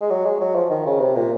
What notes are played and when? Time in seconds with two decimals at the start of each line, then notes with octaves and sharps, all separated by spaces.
0.01 G#3
0.10 F#3
0.25 G#3
0.40 F#3
0.55 F3
0.70 D#3
0.86 C#3
1.00 C3
1.16 A#2